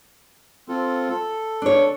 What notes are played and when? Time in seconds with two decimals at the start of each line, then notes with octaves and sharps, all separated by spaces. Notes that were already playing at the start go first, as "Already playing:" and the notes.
0.68 C4 F4 A4
1.10 A4
1.62 D4 C#5